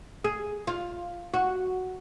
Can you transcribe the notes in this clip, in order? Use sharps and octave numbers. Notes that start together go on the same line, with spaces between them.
G#4
F4
F#4